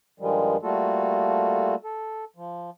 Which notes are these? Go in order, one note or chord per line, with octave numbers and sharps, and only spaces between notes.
G2 D#3 F3 G3 G#3
G3 A3 A#3 F4 F#4 A4
A4
F3